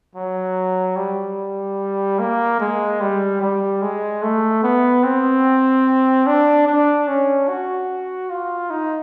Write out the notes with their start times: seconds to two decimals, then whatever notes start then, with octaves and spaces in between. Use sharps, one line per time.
0.15 F#3
0.97 G3
2.19 A#3
2.60 G#3
3.01 G3
3.41 G3
3.82 G#3
4.23 A3
4.63 B3
5.04 C4
6.27 D4
6.67 D4
7.08 C#4
7.49 F#4
8.30 F4
8.71 D#4